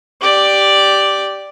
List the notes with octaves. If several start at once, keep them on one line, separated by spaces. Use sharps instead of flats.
G4 D5